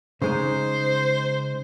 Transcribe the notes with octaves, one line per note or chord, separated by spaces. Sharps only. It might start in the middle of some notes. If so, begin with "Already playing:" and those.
C#3 G#3 D#4 C5